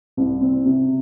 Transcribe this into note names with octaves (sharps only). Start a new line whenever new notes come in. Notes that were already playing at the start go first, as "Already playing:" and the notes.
C2
C4
C3